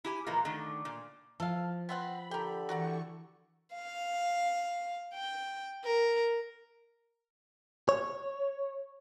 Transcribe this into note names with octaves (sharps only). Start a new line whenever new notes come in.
E4 G4 G#5
A#2 E3 F3 G#3 A#3
D3 D#3 A3
A#2
F3 A4 F5
B3 C4 F#5 B5
D3 G4 A4 A#4 G5
E3 F#4 A#4 D5 C#6
F5
G5
A#4
C#5